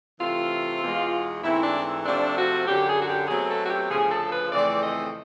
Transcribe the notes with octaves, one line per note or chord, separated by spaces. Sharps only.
C3 E3 A3 C4 F4
E2 B2 G#3
G#2 E3 A3 C4 E4
D4
C3 F3 A3 C4 D4
F#4
F#2 D3 F#3 G4
G#4
F#4
G4
B2 F#3 A3 C4 G#4
A4
F#4
G4
D2 C#3 F3 G#4
A4
B4
F2 C#3 E3 A3 C4 D5
D#5